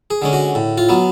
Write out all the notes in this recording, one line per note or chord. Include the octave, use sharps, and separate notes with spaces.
G#4
D3 G#3 C#4
F#4
A2
F4
F#3 B3